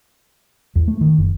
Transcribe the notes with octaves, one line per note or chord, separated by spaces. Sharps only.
E2
A3
D#3
F#1